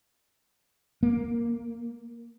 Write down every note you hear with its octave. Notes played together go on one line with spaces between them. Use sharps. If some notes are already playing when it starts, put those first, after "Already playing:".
A#3